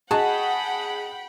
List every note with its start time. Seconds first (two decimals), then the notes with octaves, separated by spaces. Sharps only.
0.11 F#4 G#4 D#5 F#5 G5 A5 B5